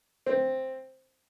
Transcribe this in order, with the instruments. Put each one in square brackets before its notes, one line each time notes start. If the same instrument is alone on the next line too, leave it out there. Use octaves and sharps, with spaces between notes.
[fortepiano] C4